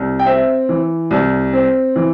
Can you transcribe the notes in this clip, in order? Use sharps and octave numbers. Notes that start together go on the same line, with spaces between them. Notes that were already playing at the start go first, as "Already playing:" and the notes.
Already playing: C2
G5
C4 E5
E3
C2
C4
E3